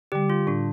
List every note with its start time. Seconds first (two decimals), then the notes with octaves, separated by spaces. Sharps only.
0.12 D3 G3 G4
0.30 F4
0.47 A2 D4